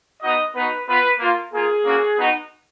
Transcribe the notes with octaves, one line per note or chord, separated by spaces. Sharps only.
B3 D#4 F#4 D#5
B3 D#4 F#4 B4
B3 F4 B4
A#3 F4
A#3 F4 G#4
A#3 C#4 F#4
B3 D#4 F#4